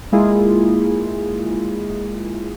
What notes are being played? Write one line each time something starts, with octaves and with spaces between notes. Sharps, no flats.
G#3 A#3 E4 F4 G#4